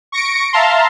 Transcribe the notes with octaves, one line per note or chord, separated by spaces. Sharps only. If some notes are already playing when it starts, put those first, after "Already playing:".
C#6 A#6 C#7 D7
E5 F5 A5 A#5 C6